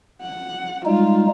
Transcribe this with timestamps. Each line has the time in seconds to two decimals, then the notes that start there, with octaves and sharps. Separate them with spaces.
0.22 F#5
0.86 G3 G#3 D#4 F4